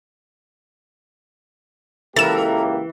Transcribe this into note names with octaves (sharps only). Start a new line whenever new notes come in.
C#2 E3 A#3 G4 A4 A#4 A6 E7